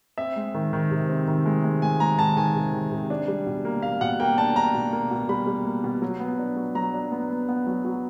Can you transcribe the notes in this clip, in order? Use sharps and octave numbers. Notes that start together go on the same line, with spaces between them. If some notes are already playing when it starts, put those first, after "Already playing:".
C4 E5
G#3
D#3
D#3
C3
C4
D#3
G#3
G#3
G#3 G#5
G#3 A#5
D#3 A5
D#3 G#5
C3
D#3
C3
D4
G3
B2
A#3
A#3 F5
B2 F#5
A#3 G5
D4 A5
D4 A#5
B2
A#3
B2
G3 B5
G3
A#3
B2
F#3
B3
D4
F#3
F#3 A#5
D4
B3
B3
B3
F#3
F#3